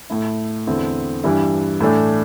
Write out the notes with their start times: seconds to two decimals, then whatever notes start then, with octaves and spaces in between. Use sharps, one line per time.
0.10 A2 A3 E4
0.67 E2 D3 C4 E4
1.24 G2 E3 G3 E4
1.81 A2 E3 A3 D4